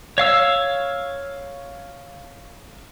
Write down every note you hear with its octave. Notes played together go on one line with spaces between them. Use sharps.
C#5 F5 E6